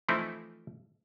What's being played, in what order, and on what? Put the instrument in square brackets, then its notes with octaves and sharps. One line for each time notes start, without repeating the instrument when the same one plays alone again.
[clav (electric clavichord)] E3 F3 A3 C4 D#4 E4